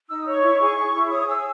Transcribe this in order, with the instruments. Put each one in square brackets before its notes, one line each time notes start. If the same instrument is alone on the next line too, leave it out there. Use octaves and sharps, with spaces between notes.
[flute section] D#4 E6
D#6
C#5
C#6
E4
G#4
G#4
E4
C#5 D#6
G#4 E6